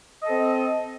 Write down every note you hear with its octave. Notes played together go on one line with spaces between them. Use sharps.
C4 A4 D#5